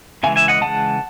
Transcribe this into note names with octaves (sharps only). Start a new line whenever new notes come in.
C#3 E3 G#3 E5 G#5
E5 G#5
D#5 F#5
C#3 E3 G#3 F#5 A5